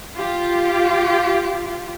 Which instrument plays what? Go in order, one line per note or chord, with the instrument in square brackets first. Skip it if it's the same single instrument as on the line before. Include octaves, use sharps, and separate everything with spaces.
[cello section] F4 G4